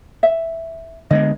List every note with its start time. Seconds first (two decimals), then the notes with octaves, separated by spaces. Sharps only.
0.23 E5
1.10 D3 G#3 B3 D#5